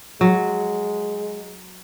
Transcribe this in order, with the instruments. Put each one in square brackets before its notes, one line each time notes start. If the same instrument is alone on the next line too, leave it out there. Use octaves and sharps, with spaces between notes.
[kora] F#3 [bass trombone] G#3